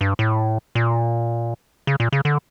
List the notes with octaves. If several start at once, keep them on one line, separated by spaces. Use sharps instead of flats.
G2
A2
A#2
C#3
A#2
C#3
D3